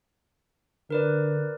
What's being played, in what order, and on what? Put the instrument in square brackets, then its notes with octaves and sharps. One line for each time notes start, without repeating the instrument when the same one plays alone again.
[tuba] D3 [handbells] A#4 B4 D5